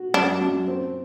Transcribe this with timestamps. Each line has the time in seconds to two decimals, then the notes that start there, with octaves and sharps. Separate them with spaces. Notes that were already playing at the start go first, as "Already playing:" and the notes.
Already playing: F#4
0.14 F#2 D4
0.41 F#2
0.68 C4